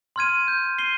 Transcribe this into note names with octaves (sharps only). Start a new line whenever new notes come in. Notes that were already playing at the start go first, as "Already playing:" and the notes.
C6 F6 G#6 D#7
G6
C7 D#7 G7